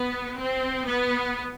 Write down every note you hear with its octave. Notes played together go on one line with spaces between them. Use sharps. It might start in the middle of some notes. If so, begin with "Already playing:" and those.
Already playing: B3
C4
B3